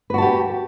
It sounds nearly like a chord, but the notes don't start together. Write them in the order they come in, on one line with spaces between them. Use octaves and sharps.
B4 F#4 A5 G4